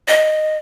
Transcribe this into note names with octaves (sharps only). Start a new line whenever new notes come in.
D#5